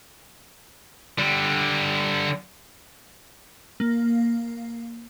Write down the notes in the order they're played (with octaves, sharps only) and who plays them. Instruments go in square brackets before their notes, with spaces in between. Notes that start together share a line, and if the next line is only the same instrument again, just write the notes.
[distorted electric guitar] D3 G3
[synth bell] A#3